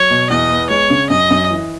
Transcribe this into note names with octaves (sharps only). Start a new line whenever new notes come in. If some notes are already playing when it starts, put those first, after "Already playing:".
Already playing: F#3 C#5
B2
E2 D#5
B3
G#3 C#5
C#3
F#2 D#5
F#2
E3